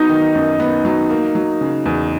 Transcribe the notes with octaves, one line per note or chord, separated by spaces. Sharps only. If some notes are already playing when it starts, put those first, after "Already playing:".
Already playing: F#3 B3 D#4
D#3
F#2
B3
F#3
A#3
F#3
C#3
E2